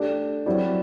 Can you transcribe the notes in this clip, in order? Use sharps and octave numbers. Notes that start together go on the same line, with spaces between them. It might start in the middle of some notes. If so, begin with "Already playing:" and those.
Already playing: A3 D4 G4 D5
F#3 C4 E4 G4 D5